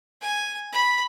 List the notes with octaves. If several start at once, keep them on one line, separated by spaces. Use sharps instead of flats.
G#5
B5